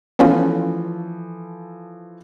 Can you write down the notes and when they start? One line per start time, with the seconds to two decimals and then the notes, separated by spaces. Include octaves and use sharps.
0.19 E3 F3 A3 B3 C#4 F4